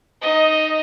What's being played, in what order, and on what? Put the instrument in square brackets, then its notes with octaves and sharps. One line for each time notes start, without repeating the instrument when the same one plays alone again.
[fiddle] D#4 D#5